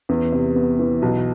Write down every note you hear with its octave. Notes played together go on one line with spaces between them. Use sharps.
E2
C3
B3
E3
B1